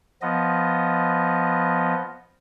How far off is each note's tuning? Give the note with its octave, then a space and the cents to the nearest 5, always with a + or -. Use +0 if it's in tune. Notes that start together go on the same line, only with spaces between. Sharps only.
F3 +0 B3 +0 D#5 +0